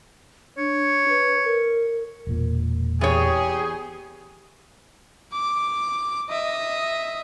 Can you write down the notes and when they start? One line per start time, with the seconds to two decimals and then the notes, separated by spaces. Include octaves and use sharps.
0.58 D4 C#5
1.09 B4
1.45 A#4
2.27 E1 A#2
3.01 E2 G4 G#4 C#5
5.33 D6
6.30 D#5 E5